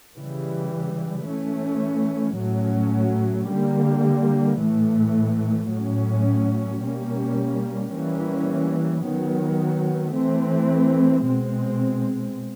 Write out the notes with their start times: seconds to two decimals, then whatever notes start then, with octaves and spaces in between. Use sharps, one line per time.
0.16 C#3 E3 G3
1.27 E3 A3 C#4
2.38 A2 F#3 A3 C#4
3.49 D3 G3 A#3
4.60 A2 E3 A3
5.71 A2 F#3 A3 C#4
6.82 B2 G3 A#3 C#4
7.93 E3 G3 A#3 C#4
9.04 D#3 F#3 B3
10.15 E3 A3 C4
11.26 B2 G#3 C4